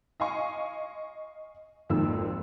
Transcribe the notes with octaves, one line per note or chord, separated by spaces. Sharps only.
D#5 F5 G#5 C#6
G#1 F2 D#3 A#3 E6